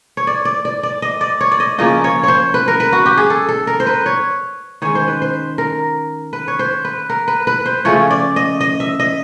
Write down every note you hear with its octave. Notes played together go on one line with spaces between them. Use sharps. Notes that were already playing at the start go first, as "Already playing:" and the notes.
C#5
D5
D5
D5
D5
D#5
D5
C#5
D5
D#5
C#3 F3 A#3 C#4 D#5
C#5
C5 C#5
B4
A#4
B4
F#4
G4
G#4
A4
A4
A#4
C5
B4
C#5
D#3 G#3 C#4 C#5
C5
B4
C5
A#4
B4
C#5
C5
B4
A#4
B4
B4
C5
C#3 F3 A3 C#4 C#5
D5
D#5
D#5
E5
D#5